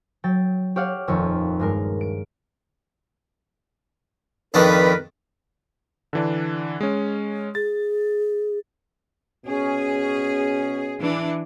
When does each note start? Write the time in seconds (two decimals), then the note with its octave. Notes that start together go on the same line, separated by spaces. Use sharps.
0.24 F#3 G5 A6
0.76 G4 C#5 D5 F5 F#5
1.08 D#1 F2 D#3 C#6
1.60 G2 G#3 A#4
2.01 D7
4.54 F2 D#3 D4 A#4 B4
6.13 D3 E3 D4
6.80 G#3 C#4
7.55 G#4 A6
9.46 B2 C#4 G#4
11.01 E3 D4